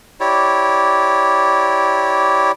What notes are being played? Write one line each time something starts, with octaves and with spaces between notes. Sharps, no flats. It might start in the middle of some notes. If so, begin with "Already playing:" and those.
E4 G4 C#5 D5